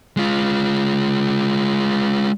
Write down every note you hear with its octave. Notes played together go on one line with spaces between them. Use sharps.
G#3 F4